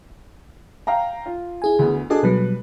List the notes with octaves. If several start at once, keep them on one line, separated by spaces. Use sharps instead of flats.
F5 G5 A#5
F4
E4 G#4 G#5
D2 B3
D4 F#4 G#4 A4 D#5
B2 F#3 G3 B4